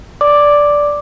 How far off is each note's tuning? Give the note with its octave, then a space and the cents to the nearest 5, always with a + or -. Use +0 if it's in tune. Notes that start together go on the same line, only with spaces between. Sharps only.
D5 -5 D6 +0